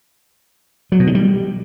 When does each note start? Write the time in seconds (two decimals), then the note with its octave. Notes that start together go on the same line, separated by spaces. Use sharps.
0.92 F#3
1.00 B2
1.07 D#3
1.15 G3